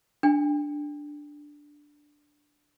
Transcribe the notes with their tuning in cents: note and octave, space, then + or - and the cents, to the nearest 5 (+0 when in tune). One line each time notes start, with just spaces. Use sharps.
D4 +0 G5 +35